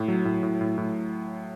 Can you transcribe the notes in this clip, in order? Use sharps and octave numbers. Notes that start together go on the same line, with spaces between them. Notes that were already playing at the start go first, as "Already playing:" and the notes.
Already playing: A2
F#3
A2
A2
A2
A2